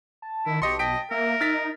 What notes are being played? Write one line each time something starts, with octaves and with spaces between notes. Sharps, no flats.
A5
D#3 E4
B1 G4 D#5 C6 C#6
D#5 G5 B6 D7
A#3 A#4 E5
D#4 F6 A6 B6